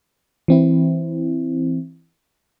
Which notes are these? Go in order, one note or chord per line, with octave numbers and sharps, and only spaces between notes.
E3 C4 E4